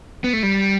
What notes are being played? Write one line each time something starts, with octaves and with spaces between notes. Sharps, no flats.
B3
A3
G3